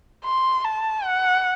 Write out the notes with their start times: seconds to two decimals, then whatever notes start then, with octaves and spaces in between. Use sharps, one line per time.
0.25 C6
0.64 A5
1.04 F#5